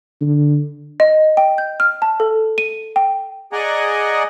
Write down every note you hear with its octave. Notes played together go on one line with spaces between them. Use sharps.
D3
D#5
G5
G6
F6
A5
A4
D#7
G5
G#4 D5 D#5 F#5 G#5 A#5